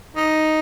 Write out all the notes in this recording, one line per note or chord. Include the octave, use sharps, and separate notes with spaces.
D#4